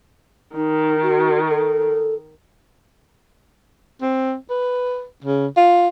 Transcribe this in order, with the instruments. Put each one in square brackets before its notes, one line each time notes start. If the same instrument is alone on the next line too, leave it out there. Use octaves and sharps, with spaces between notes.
[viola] D#3 [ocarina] D#4
[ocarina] F#4
A4
[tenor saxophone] C4
B4
C#3
F4